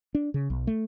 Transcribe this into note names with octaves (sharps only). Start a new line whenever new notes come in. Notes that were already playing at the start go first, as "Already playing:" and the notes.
D4
C#3
B1
A3